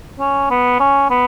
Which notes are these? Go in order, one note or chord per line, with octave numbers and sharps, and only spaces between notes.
C#4
B3
C#4
B3